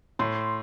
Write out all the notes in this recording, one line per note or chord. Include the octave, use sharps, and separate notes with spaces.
A2 C6